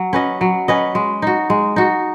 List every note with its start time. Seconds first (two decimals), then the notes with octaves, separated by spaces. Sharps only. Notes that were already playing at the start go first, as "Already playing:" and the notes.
Already playing: F#3
0.13 C#4 B4 D#5
0.41 F#3
0.68 C#4 B4 D#5
0.95 G#3
1.22 D#4 F#4
1.50 G#3
1.76 D#4 F#4